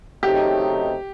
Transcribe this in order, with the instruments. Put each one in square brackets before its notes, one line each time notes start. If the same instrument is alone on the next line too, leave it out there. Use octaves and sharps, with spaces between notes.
[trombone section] C#3 F#3 A3 C4 D#4 [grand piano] G4